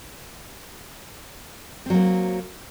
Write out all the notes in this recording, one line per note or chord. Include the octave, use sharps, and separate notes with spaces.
F#3 A#3 C4